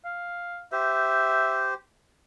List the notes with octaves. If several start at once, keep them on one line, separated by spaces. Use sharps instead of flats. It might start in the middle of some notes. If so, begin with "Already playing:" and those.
F5
G4 C5 E5